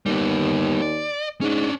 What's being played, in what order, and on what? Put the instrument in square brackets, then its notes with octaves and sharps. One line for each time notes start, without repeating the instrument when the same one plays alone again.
[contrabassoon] D#2 [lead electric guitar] G3 B3
[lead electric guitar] D5
[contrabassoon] G#2 [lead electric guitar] C#4 D4